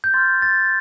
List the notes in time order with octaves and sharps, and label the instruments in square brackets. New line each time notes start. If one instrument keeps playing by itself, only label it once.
[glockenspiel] G6
C6 F6 A6
A6